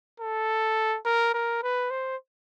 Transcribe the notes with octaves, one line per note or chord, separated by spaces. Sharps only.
A4
A#4
A#4
B4
C5